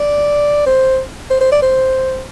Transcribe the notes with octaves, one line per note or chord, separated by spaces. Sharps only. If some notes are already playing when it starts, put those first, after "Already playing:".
Already playing: D5
C5
C5
C5
D5
C5